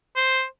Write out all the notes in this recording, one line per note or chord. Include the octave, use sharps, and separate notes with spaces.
C5